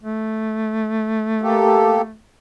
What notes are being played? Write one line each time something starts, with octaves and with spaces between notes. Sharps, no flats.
A3
A#3 G4 A4